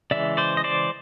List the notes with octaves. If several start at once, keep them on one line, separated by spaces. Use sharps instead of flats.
C#3 E3 G#3 D5 E5
C5 D5
D#5
C5 D5